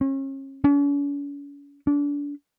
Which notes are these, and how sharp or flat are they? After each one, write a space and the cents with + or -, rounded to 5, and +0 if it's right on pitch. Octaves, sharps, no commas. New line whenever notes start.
C#4 -35
C#4 +45
D4 -30